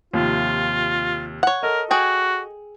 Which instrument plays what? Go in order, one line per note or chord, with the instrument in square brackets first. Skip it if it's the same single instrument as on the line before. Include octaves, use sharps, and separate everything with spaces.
[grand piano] D#2 C3 F3 [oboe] F4
[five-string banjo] C#5 F#5
[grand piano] A4 D#5 [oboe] A#4
[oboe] F#4 [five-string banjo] G#4 G5